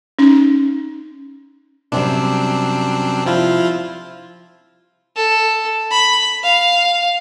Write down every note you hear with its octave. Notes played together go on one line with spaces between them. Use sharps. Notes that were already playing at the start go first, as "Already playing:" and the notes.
C#4 D#4
F#2 C3 G3 C4 D4
F3 E4 F4
A4
B5
F5